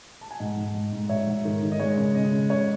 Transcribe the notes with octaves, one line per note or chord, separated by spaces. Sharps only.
A5
G#5
G#2 D#5 F#5
G#2
G#2
G#2
G#2 C#5 E5
G#2
D#3
D#3
D#5
G#3 C#5
C#3
C#3 D#5
C#3
C#3 C#5